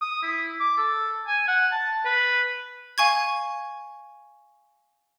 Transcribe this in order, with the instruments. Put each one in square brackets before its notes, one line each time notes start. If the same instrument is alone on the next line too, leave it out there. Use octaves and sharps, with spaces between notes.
[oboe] D#6
E4
D6
A4
G#5
F#5
A5
B4
[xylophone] F5 G#5 C#6 G#6